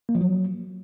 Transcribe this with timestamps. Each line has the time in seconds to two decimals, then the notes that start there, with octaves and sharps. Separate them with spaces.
0.09 A#3
0.15 F3
0.21 F#3